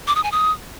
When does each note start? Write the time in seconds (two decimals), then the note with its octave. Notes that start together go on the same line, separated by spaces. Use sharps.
0.07 D6
0.16 D#6
0.24 G#5
0.32 D#6